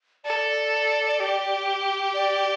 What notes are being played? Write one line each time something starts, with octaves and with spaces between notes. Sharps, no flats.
A4 D5
G4
D5